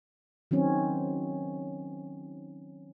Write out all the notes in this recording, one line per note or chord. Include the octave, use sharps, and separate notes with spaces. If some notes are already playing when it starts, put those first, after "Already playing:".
D#3 F#3 C4 C#4